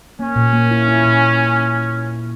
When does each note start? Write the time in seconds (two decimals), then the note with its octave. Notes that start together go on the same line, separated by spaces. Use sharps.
0.19 A#3 C#4
0.36 A#2
0.53 A#3
0.71 E4
0.88 E4
1.05 A#2